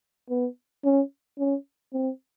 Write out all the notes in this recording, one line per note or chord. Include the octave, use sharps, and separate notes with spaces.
B3
C#4
C#4
C4